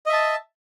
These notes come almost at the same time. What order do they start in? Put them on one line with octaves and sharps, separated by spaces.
D#5 E5 A5